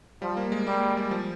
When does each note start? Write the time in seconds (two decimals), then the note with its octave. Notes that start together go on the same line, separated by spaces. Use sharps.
0.22 F3 G3
0.37 A#3
0.52 G#3
0.67 G3 A#3
0.97 G3
1.11 F3